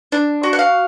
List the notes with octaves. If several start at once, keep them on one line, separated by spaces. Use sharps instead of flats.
D4
F#4
F#5
F5